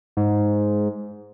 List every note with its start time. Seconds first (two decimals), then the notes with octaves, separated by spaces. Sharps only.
0.17 G#2